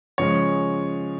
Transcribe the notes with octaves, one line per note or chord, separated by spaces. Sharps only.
C#3 F3 G#3 C#5